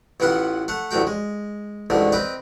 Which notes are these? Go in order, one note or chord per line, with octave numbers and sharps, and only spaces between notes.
A1 E3 B3 F4 F#5
A3 F#5
A1 D2 A3 F#4 G5
G#3
A1 D2 G#2 D3 A3
C4 B4 D#5 G5